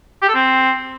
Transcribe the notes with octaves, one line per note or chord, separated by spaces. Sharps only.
G4
A4
C4